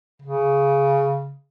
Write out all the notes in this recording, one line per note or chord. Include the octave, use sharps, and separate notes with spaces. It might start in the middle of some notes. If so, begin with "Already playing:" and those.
C#3